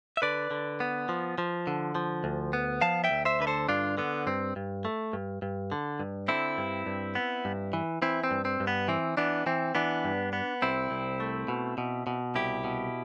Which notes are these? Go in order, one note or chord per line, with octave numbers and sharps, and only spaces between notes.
E5
D3 B4 D5
D3
B3
F3
F3
D3
F3
D2
B3
F3 F5 A5
E5 G5
D2
C5 E5
D3 B4
A4 C5
G2 D4 F4
D3 B3
G2 C4
G2
A3
G2
G2
D3
G2
D3 C4 E4
G2
G2
B3
G2
E3
E3 C4 E4
C4
G2
C4
G2
B3
E3 C4
E3 B3 D4
E3 C4
E3 B3 D4
G2
B3
C2 C4 E4
C2
A3
B2
B2
B2
C2 E4 G4
B2